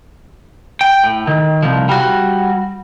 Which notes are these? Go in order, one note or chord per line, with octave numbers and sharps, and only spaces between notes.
G5
A2
D#3
C2 F3
G3 F#4